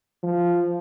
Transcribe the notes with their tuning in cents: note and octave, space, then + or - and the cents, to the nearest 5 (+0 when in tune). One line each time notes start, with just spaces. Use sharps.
F3 -5